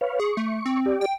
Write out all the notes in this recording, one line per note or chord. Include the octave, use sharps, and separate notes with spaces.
B4 C#5 F5
G#4 C#6
A3
C4
G4 D5
G5